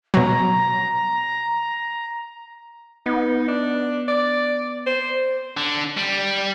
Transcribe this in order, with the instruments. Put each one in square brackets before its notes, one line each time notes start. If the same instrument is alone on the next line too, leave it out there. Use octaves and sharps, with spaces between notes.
[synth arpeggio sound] B2 F#3 [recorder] A#5
[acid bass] B3 [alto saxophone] D#4
[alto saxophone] D4
D5
C5
[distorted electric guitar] D3
G3